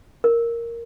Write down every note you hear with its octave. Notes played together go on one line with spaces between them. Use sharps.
A#4